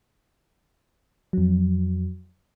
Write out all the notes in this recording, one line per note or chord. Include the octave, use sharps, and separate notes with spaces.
F2 F#3